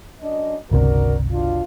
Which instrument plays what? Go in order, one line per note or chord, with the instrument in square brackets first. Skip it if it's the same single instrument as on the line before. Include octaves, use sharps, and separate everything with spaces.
[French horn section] F#2 D4 D#5
[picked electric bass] G1 C#2 C3 [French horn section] D4 F#4 A#4
[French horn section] B2 D4 F4